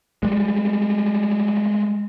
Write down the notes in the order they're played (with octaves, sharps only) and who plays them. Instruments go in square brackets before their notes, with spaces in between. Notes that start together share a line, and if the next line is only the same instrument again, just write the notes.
[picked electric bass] G3 G#3